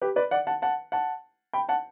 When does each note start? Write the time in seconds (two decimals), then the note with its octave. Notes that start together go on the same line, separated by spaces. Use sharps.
0.01 G4 B4
0.16 B4 D5
0.31 D5 F#5
0.47 F#5 A5
0.62 F#5 A5
0.92 F#5 A5
1.53 G5 B5
1.69 F#5 A5